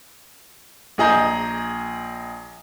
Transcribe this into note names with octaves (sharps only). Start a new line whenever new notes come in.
A#1 G#4 D#5 A#5 G6